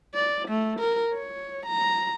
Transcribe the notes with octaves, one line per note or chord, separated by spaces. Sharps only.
D5
A3
A#4
C#5
A#5